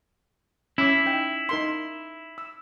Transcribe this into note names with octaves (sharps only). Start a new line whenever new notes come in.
C#4 E4 D6
D#4 E5 G5
D#4 A#4 C6
E6